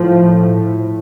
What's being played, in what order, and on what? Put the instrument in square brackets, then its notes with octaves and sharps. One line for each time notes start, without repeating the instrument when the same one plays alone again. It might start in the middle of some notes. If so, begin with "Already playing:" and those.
Already playing: [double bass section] A2 F3